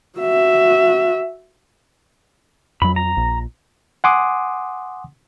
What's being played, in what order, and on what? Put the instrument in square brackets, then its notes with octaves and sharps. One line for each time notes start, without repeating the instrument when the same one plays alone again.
[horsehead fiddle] F#4 E5
[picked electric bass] F2 F#3 [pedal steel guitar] B5
[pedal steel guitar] A#5
[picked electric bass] A#1
[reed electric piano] F#5 G#5 C6 D6 D#6